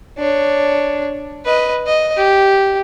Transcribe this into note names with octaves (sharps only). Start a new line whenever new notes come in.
D4 C#5
B4 D#5
D#5
G4